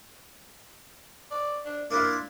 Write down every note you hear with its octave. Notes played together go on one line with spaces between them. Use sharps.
D5
D4
A#3 D4 E4 F4